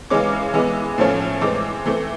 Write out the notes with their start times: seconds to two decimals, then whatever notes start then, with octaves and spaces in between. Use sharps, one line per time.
0.10 C#3 E3 G#3 C#4 D6
0.54 E3 G#3 B3
0.98 A2 F3 A3 C#4
1.41 E3 G#3 C4 D6
1.86 E3 A3 C4